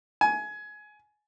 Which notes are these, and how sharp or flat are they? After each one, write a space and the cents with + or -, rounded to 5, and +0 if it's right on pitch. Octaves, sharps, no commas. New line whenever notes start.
G#5 +20